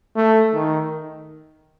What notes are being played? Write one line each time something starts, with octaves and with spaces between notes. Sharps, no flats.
A3
D#3